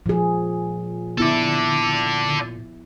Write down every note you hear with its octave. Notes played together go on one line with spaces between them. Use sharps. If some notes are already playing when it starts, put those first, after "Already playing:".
A#2 F3 G#4
B3 E4 A4 D5